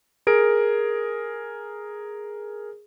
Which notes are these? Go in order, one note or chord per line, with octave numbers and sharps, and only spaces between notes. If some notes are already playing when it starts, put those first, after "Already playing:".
G#4 A#4 D7